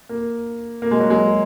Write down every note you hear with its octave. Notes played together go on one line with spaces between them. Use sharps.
A#3
A#3
G#3
F#3
G#3